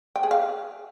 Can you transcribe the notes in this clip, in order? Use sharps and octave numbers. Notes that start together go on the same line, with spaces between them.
G5
G#4
F5